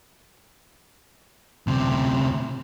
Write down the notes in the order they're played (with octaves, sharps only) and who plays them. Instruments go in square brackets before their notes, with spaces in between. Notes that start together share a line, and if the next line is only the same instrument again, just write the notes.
[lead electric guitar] D2 C3